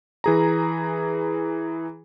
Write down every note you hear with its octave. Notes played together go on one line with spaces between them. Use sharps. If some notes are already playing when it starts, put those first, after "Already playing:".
E3 G#4 A#5